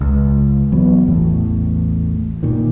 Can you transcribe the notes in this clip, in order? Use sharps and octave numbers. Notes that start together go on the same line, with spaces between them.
C#2
E3 F#3 B3
A1 E2 A2
A#2 D#3